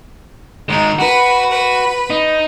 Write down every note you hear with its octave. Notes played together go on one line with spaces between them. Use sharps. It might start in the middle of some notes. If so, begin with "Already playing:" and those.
D#3 G#3 D#4
F#4 B4
B4
D#4